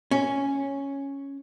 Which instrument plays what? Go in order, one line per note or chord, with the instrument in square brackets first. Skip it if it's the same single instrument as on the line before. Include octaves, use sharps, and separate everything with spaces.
[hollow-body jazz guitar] C#4